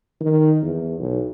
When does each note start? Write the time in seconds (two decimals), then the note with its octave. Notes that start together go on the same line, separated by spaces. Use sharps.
0.21 D#3
0.62 E2
1.00 B1